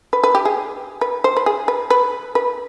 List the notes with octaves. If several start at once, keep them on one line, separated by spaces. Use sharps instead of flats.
B4
B4
G4
G#4
B4
C5
B4
G#4
B4
B4
B4